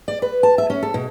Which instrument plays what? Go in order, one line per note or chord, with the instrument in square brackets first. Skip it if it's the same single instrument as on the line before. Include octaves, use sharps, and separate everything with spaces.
[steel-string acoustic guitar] D5
B4
A5
E5
C#4
A4
B2